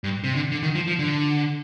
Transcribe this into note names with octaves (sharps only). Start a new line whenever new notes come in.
G2
C3
D3
D3
D#3
F3
F3
D3